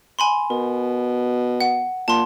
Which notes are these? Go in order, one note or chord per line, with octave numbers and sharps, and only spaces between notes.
G#5 B5 C6
B2 A#4
F#5
A#2 A5 C6